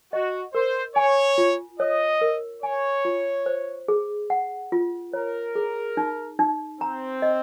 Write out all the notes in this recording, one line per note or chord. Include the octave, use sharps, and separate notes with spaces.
F#4 D#5
A#4 C5
C#5 G#5
F4
C#5 D#5
A#4
C#5 G#5
F4
C5
G#4
F#5
F4
A#4 C#5
G#4
D#4
D#4
C4 A#5
D#5